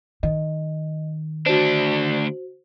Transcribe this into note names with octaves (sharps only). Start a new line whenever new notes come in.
D#3 D#5
D2 D4 F#4 C5